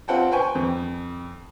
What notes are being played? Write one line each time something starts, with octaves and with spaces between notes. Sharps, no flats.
C4 F4 F#5 G5 A5
B4 C5 G5 G#5 C#6
F2